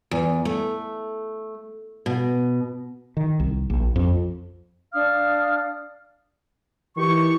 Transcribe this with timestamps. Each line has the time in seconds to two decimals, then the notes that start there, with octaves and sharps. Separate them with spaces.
0.11 E2
0.45 A3
2.06 B2
3.17 D#3
3.40 C2
3.70 A#1
3.96 F2
4.93 D4 F5 D#6 F6
6.97 D#3 E3 G4 C#6